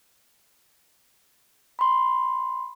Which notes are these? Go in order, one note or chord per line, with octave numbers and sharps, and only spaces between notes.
B5 C6